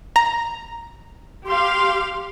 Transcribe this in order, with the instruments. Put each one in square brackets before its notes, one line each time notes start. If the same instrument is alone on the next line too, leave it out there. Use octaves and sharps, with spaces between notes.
[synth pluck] A#5
[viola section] G4 F5 [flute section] C6